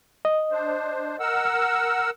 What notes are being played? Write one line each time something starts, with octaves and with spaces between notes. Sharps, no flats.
D#5
D4 C5
A#4 F#5 E6